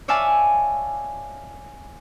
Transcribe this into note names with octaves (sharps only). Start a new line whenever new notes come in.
C#5 D5 E5 F5 G#5 A5